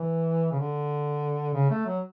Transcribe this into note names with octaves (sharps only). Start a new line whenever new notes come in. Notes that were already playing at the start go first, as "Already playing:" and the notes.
Already playing: E3
C#3
D3
C#3
A3
F#3